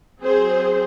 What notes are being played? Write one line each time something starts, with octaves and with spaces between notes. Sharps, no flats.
F#3 C4 G#4 C5